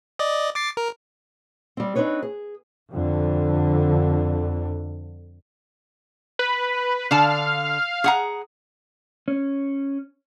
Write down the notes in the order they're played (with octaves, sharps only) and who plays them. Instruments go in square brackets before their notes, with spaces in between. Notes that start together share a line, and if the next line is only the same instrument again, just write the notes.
[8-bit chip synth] D5 D#5
D6 A6 C7
A#4
[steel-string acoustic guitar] G3 C4
C4 D4 D#4 B4 C#5
G#4
[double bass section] F2 D3
[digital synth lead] B4
[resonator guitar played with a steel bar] D3 A5 [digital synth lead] F5
[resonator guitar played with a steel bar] G#4 F#5 A#5
[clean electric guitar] C#4